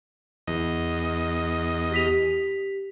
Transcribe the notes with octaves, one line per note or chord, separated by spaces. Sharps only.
E2 D#5
G4 B6 F7